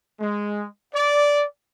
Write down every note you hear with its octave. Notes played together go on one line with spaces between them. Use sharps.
G#3
D5